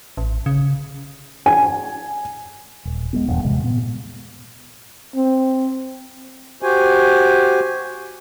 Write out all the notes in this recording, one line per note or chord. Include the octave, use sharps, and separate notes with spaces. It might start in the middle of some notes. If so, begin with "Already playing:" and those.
A1
C#3
G#5
D#1
G#3 B3 C4
D#1 E2 G2
G#2 C3 E3 G#3
A#2 B3
C4
F#4 G4 C5 G#5